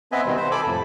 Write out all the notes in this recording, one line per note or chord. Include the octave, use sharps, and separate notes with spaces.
B3 C4 B4 D#5 E5 G#5
B2 D#3 G3 C4
C5
A4 G#5 B5 D6
F2 A2 C3